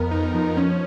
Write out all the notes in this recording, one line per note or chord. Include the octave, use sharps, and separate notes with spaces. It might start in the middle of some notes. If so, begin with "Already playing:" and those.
Already playing: F2 B3 A#4
D#4
F3
C#4